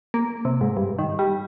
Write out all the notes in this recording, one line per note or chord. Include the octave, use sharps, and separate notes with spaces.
A#3
C3
G#2
G2
D#3
G3